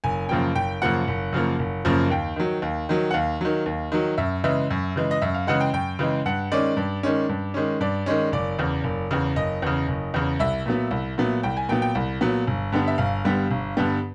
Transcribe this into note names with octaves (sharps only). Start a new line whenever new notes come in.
F#1 G#5
F#2 C#3 F3 A#3 G5
F#1 G5
F#2 C#3 F3 A#3 F#5
F#1
F#2 C#3 F3 A#3
F#1
F#2 C#3 F3 A#3
D#2 G5
D#3 F#3
D#2
D#3 F#3
F#5
D#2 F5
D#3 F#3
D#2
D#3 F#3
F#2 E5
C#3 E3 G#3 E5
F#2
C#3 E3 G#3
D#5
F#2 E5
F5
C#3 E3 G#3 F#5
G5
F#2 G5
C#3 E3 G#3
G2 F#5
D#3 G#3 C#4 D5
G2
D#3 G#3 C#4
G2
D#3 G#3 C#4
G2 D5
D#3 G#3 C#4
F#1 D5
E2 C#3
F#1
E2 C#3
F#1 D#5
E2 C#3
F#1
E2 C#3
C2 E5
A#2 F#3 B3
C2
A#2 F#3 B3
C2 G5
G#5
A#2 F#3 B3 G5
G5
C2
A#2 F#3 B3
G1
G2 D3 G3 B3
E5
G1 F5
G2 D3 G3 B3
G1
G2 D3 G3 B3